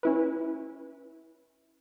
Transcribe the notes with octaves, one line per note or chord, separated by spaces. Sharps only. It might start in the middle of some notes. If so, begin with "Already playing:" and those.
C#4 E4 B4